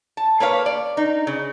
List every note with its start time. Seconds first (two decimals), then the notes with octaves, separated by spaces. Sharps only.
0.17 A5
0.40 A#3 B4 C#5 F5
0.66 D5
0.97 D#4
1.27 C#3